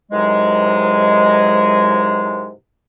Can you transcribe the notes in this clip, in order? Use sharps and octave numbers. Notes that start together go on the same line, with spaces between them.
G#2 C3 D#3 E3 F#3 G#3